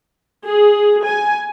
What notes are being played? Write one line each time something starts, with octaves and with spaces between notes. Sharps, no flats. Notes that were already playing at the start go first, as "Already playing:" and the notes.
G#4
G#5